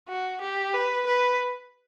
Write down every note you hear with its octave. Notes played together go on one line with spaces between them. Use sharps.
F#4
G4
B4
B4